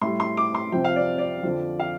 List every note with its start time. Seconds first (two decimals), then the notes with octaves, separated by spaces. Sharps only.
0.01 A2 G3 C6
0.20 C6
0.37 D6
0.55 C6
0.72 F2 C3 F3 G5
0.84 F5
0.96 D5
1.18 D5
1.43 F2 D3 F3
1.80 F5